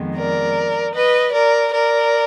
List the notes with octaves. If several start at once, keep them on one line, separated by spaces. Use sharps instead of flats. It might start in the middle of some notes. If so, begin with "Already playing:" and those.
Already playing: F2 D#3 G#3 B3
A#4 D5
B4 D#5
A#4 D5
A#4 D5